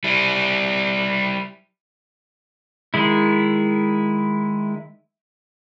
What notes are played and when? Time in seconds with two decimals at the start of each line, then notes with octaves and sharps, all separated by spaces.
0.04 G3 E4
2.94 D#3 G#3 E4